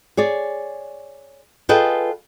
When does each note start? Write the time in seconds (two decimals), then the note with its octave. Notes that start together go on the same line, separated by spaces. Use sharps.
0.17 G#4 C#5 D5
1.69 F4 G#4 A4 B4 D#5 G5